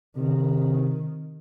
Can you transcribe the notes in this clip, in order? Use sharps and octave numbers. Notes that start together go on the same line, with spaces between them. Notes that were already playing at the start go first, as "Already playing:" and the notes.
C3 D#3